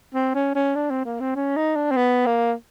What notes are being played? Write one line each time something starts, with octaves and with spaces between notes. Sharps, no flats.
C4
C#4
C#4
D4
C4
A#3
C4
C#4
D#4
D4
C4
B3
A#3